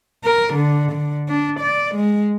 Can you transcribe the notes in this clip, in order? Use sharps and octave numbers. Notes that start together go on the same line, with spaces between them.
A#4
D3
D3
D4
D5
G#3